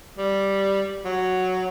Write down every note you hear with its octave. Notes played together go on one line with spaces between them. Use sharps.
G3
F#3